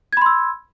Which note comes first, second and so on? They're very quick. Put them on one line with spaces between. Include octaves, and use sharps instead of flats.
G#6 B5 C6 E6